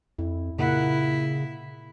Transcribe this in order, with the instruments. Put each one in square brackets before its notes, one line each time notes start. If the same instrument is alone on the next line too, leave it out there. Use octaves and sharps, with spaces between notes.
[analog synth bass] F2 [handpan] E4
[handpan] A#2 A#4 F#5 [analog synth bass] C#3 [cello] E4